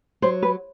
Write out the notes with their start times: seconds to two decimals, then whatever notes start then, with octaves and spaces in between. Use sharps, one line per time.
0.22 F#3 C5
0.43 B4